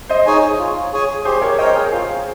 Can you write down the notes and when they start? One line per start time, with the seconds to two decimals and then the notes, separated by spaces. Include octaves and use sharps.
0.09 C5 D#5
0.26 D#4 G#4 C#5 G#5
0.59 F4
0.93 G#4 C#5 G#5
1.25 G4 G#4 C5
1.42 A#4 C#5
1.58 A#4 C5 C#5 D#5 G5
1.76 G#4
1.91 F4 G#4 C5